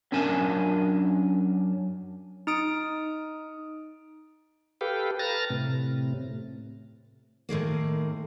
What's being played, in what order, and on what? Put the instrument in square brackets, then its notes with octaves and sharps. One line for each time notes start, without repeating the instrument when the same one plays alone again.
[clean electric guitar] F#2 C#4 D4 A#4 G#5 A5
[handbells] D#4 D#6 D7
[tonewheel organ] G4 A4 B4 F5 G5
B4 A5 A#5 F6 A6 A#6
A2 C3
[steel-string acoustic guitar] A2 D#3 G#3 A#3